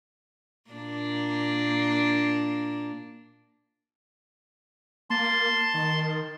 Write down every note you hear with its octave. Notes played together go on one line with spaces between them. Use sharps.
A#2 A#3 D4
A#3 A5 C6
D#3